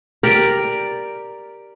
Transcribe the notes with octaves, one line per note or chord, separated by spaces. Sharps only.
G4 A#4 D5